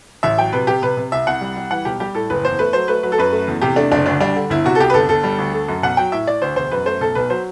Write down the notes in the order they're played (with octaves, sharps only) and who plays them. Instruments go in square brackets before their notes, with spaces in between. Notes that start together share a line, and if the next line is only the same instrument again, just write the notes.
[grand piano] A1 E5
F#3 G5
C3 B4
C3 G4
C3 B4
C3
C2 E5
C2 F#5
G3
G3
E3 F#5
B1 G4
G3 G4
A2 A4
F#1 B4
E2 C5
A3 B4
F#3 C5
A3 B4
F#3 B4
A4
F#2 B4
A3
E2
C3 G4
A3 D4
F#1 D4
D2 D4
G3 D4
D3
G1 E4
C3 F#4
A4
C2 G4
B4
G1 A4
G1 A4
G3
D2
A3
F#2
B1 F#5
F#3 G5
A2 E5
A2 D5
D2 C5
E1 C5
F#2 B4
A3 C5
B1 A4
B1 B4
F#3 C5